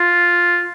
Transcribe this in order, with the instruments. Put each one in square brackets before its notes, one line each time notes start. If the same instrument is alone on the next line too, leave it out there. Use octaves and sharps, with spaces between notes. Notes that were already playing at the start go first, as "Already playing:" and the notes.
Already playing: [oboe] F4